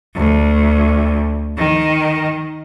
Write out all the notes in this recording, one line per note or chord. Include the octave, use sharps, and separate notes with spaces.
D2
D#3